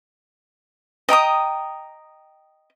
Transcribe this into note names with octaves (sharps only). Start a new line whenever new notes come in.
D#5 G5 A#5 D#6